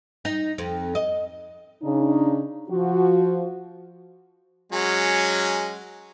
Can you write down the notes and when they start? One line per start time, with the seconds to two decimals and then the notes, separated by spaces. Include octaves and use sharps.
0.25 D#4
0.58 F2
0.95 D#5
1.82 C#3 D4 D#4
2.70 F3 F#4
4.72 F#3 G#3 C#4